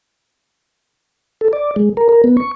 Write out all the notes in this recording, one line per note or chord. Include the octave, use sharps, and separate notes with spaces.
A4
D5
G#3
A#4
A#4
B3
C#6